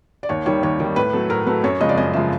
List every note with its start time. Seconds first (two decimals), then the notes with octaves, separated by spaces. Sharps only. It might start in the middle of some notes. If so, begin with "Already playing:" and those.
0.23 D5
0.29 D#2 C#5
0.46 D#3 G3 C#5
0.63 D#2 C#5
0.80 D#3 G3
0.96 A2 B4
1.13 F#3 A3 A4
1.30 A2 A#4
1.47 F#3 A3 B4
1.64 F#2 C#5
1.81 C#3 F3 G#3 D#5
1.89 D5
1.97 F#2 D#5
2.13 C#3 F3 G#3 E5